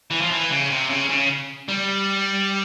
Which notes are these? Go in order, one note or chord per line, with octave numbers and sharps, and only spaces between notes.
E3
F3
E3
C#3
C3
C#3
C#3
G3